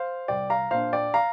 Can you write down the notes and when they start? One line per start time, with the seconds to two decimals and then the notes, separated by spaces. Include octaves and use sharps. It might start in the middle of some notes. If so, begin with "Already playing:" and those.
Already playing: C5 F5
0.28 C2 D5 G5
0.50 F5 A#5
0.71 A#2 A#3 D4 C5 F5
0.93 D5 G5
1.14 F5 A#5